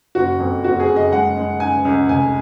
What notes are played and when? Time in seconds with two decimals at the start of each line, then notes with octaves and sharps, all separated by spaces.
0.15 F#1 F#4
0.39 F2
0.64 F#1 F#4
0.80 G#4
0.87 F#1
0.96 D#5
1.12 G#3 F#5
1.37 G#3
1.60 C#3 G#5
1.85 C#2
2.09 F1 G#5